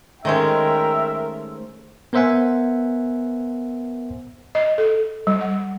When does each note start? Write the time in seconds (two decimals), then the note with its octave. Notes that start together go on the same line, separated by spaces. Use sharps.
0.25 D#3 G#3 A3 C#4 A#4 C5 E5 G5
2.13 B3 A#4 C5 E5 F#5 G#5
4.55 D#5
4.78 A4
5.27 G3
5.41 F#5